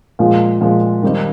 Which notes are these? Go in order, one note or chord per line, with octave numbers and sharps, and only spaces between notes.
A#2 F3 G#3
A#2 F3 G#3
D#3 G3 C4 D#4